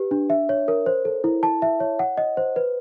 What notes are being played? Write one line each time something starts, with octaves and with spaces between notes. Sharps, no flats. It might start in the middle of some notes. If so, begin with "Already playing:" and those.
Already playing: G4 B4
D4
E5
C#5
A#4
C5
A4
E4
A5
E5
C#5
F#5
D#5
C5
B4